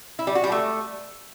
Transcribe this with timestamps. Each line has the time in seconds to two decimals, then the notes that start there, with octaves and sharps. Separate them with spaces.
0.19 E4
0.27 G3
0.35 F#4
0.44 G3
0.52 A3